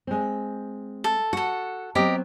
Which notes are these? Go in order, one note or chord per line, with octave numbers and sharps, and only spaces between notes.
G#3 C4
A4
F#4 A4 F#5
F#3 B3 C4 G4 A#4 D#5